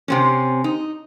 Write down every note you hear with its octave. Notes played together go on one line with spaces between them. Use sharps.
C3 C4 C#4
D#4